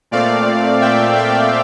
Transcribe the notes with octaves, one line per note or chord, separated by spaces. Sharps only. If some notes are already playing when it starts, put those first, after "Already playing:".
A#2 A3 C4 D5 F5
E5 G5
E5 G5